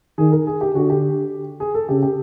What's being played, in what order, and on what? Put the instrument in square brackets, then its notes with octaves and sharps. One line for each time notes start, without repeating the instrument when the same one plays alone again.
[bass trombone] D#3 [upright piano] G#4
[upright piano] A#4
G#4
G4
[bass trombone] D3 [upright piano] F#4
[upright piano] G4
G#4
A4
[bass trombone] C#3 [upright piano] G4
[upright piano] G4